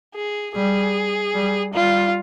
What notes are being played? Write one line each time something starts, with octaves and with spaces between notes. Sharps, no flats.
G#4
G3 G#4
G3
G3 F4